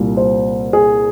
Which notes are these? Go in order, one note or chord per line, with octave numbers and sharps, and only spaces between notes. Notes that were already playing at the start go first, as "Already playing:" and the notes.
Already playing: C2 A#2 G3
C5
G#4